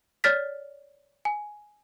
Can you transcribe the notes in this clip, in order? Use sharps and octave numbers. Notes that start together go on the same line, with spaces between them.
C#5 D5 F6 A6 B6
G#5